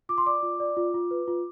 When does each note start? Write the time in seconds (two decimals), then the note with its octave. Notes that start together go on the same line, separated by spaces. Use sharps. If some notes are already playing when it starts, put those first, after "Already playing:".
0.09 F4 D6
0.18 C6
0.26 D5 D6
0.43 F4
0.60 D5
0.77 F4
0.94 F4
1.11 B4
1.28 F4